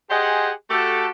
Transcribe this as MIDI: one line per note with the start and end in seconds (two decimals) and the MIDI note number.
0.11 0.51 67
0.11 0.51 68
0.11 0.51 72
0.11 0.51 75
0.11 0.51 78
0.11 0.51 80
0.71 1.08 57
0.71 1.08 66
0.71 1.08 67
0.71 1.08 69